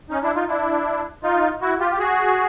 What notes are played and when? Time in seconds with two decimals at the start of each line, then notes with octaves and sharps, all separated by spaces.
0.10 C#4 D#4
0.22 D4 E4
0.35 D#4 F4
0.48 D4 E4
1.23 D#4 F4
1.61 E4 F#4
1.79 F4 G4
1.91 G4
1.99 F#4 G#4